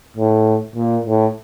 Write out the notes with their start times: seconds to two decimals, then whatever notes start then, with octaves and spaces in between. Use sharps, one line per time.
0.17 A2
0.75 A#2
1.05 A2